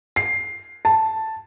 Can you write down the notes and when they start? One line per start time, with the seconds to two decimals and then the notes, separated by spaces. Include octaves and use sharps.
0.16 C7
0.85 A5